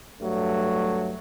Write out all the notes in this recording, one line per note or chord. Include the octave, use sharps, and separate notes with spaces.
G2 F#3 A3